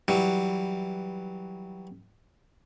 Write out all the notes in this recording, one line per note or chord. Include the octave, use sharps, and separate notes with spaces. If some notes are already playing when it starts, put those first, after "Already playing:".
E3 F#3 G3